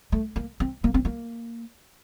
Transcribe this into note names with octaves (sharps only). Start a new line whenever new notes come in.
A3
A#3
C4
A#3
C4
A#3